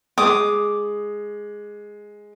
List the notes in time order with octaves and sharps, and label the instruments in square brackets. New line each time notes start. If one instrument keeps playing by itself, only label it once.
[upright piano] G#3 [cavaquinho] D6 D#6